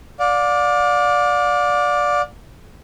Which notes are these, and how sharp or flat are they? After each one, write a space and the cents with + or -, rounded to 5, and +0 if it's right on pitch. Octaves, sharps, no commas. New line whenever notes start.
D5 +0 F5 +40